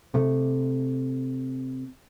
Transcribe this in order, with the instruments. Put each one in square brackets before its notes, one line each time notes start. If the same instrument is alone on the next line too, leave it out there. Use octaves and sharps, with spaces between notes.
[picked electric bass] C3 A3